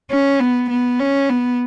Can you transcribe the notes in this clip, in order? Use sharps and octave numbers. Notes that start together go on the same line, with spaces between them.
C#4
B3
B3
C#4
B3